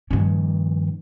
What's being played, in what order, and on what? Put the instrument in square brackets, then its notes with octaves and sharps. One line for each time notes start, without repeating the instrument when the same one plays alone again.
[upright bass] G2 A#2 [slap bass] D#3 F3 C#4